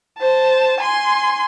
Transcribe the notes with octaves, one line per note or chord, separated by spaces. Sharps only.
C5 A5
G#5 C6